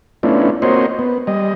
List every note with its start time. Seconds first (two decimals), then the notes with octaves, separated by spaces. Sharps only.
0.23 A3 B3 C#4 D4 E4 F4
0.62 A#3 C4 F#4 C5 C#5 D#5
0.99 B3
1.27 G3 D#5